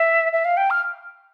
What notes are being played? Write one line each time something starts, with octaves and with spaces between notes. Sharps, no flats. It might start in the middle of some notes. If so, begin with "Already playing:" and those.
Already playing: E5
E5
F5
G5
F6